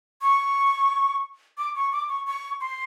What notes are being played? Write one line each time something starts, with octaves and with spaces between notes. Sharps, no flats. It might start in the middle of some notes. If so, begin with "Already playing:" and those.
C#6
D6
C#6
D6
C#6
C#6
C6